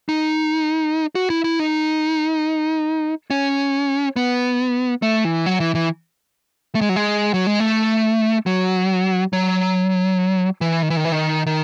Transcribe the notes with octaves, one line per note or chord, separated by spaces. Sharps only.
D#4
F#4
E4
E4
D#4
C#4
B3
A3
E3
F#3
E3
E3
A3
G#3
F#3
G#3
F#3
G#3
A3
F#3
F#3
E3
D#3
E3
D#3
E3
D#3
D#3